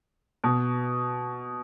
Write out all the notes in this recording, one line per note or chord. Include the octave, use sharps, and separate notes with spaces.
B2